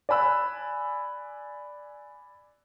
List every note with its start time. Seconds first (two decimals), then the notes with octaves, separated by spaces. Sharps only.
0.09 D5 G#5 B5 E6 F#6